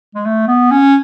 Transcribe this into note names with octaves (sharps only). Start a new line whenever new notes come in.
G#3
A3
B3
C#4